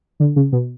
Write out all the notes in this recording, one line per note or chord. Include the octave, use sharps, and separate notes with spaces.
D3
C#3
B2